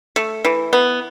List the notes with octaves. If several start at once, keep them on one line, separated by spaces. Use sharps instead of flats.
A3
E3
B3